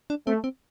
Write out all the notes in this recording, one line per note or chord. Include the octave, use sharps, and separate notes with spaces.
D4
A3 C4
C4